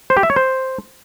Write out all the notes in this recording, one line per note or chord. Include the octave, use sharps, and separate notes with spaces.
C5
G4
E5
C#5
C5